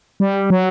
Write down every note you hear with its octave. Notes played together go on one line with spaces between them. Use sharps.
G3
F#3